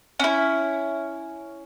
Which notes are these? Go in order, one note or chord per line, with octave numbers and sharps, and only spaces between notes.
C#4 E4